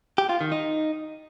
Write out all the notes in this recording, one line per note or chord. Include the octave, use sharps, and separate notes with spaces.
G4
F4
D#3
D#4